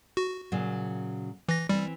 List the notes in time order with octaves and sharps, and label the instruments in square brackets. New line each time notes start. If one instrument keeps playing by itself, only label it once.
[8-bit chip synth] F#4
[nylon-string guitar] A#2 C#3 F#3
[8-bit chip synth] E3 A#6
[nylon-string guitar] E3 C4 [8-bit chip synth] G3